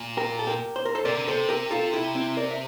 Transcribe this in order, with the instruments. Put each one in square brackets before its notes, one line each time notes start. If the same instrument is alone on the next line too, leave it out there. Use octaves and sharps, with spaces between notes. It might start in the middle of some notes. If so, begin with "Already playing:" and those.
Already playing: [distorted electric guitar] A#2
[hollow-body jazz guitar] G4 A#4
A4
G4 A#4
C5
A#4
A4 C5
[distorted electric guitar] C3 [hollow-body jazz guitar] A#4 D5
[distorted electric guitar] D3
[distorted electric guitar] C3 [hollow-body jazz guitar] A4 C5
[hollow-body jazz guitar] G4 A#4
F4 A4
E4 G4
C4 E4
A#4 D5
E5